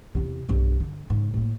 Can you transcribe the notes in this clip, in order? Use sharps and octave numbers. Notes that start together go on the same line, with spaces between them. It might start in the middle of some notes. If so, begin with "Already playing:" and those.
E2 C3
B1 G2
D3
G#2 C#3
A2 A#3